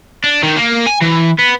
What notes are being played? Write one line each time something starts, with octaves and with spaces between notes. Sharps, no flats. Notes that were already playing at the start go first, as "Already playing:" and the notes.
D4
D#3
A#3
G#5
E3
B3